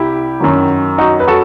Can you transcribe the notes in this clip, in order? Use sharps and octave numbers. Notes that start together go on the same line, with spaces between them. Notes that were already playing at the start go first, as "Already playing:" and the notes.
Already playing: C2 E4 G4
F#2 D#3 F#3
D#4 F#4
B4
F#4 A4